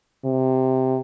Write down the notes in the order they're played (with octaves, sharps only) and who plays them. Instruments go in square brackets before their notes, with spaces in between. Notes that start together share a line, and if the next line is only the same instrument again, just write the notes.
[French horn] C3